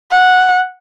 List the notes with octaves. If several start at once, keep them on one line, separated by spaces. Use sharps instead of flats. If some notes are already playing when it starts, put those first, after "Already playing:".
F#5